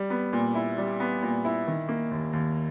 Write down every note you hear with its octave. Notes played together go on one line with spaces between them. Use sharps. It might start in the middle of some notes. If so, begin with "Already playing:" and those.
Already playing: G3
B3
A#2
E4
G3
B3
A#2
E4
D#3
A#3
D#2
D#2